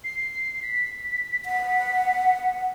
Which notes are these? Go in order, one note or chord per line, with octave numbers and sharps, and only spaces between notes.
C7
B6
F#5